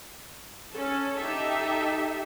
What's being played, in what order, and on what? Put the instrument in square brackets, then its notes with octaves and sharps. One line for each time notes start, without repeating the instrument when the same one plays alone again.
[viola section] C#4 A4
D#4 G4 A4 E5